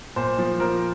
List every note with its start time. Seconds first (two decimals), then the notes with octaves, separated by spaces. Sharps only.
0.16 A#2 C5
0.38 F3
0.59 F3 A#4